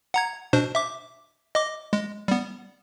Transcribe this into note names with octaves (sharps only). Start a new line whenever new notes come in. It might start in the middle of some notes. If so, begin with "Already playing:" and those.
F#5 A#5 G#6
B2 D4 C5
E5 D6
D#5 D6
G#3
G3 B3